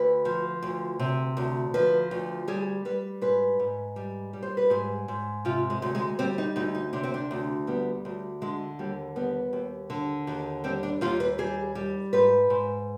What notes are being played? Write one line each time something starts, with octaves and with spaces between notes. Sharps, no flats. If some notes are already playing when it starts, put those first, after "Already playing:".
Already playing: D2 B4
F3
D2
C3
D2
F3 B4
D2
G3 G#4
G3 B4
G#2 B4
G#2
G3
G3
C5
B4
G#2 G#4
G#2
C3 F4
G#3
D2
G#3
G3 C4
D#4
D2 D#4
D#4
C3 D4
C4
D4
D2
G3 B3
D2
D3 G#3
D#2 G3
G3 B3
D#2
D3
D#2
G3 C4
D4
D#2 F4
B4
G3 G#4
G3
G#2 B4
G#2